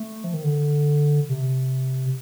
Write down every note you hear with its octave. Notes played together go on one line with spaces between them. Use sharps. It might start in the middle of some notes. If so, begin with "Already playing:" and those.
Already playing: A3
F3
D#3
D3
C3